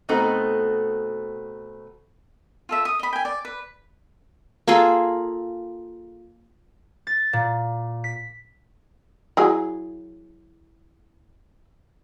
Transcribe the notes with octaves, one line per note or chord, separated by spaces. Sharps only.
B2 A3 C4 D#4 F#4 A4
F4 A4 E5
D#6
D#5 B5
G5 G#5
D5
B4
A#3 F4 G#4 A4
A6
A#2
B6
F#3 E4 G#4